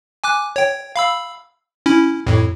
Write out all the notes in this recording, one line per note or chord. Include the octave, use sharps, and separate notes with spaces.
G#5 D6 F#6
C#5 G5
F5 B5 E6
C#4 E4
F2 A2